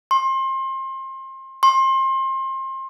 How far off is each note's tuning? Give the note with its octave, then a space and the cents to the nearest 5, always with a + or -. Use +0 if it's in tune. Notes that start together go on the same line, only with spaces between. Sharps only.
C6 +30
C6 +30